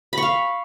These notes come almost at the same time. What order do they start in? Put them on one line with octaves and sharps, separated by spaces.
B5 C#6 F5